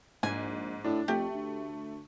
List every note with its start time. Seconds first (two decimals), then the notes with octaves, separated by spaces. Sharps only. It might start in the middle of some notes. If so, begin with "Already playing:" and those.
0.23 A#1 G#2 G#5
0.84 A2 D4
1.08 F2 A3 G4
1.34 D2